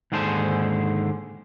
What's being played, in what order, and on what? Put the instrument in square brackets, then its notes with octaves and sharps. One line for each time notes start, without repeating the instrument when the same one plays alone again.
[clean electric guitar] D#2 G#2 D3 G#4 C5 A5